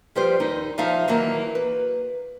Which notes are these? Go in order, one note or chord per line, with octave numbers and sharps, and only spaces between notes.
F3 G3 G4 B4 C5
D#2 D#4
F3 D#4 E5 F5
D#3 E3 F#3 A#3
B4